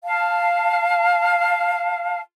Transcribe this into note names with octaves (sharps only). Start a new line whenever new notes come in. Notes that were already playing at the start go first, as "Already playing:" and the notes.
F5 A5